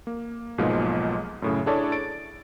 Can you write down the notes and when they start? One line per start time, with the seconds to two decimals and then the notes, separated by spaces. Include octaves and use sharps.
0.07 A#3
0.58 B1 G#2 B2 F3 G#3 A#3
1.42 F#2 A2 C#3
1.66 D4 E4 G#4 A4 C#5 D5
1.92 A6 D7